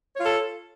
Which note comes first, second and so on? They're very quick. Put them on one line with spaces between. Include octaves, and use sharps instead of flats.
C#5 F4 A4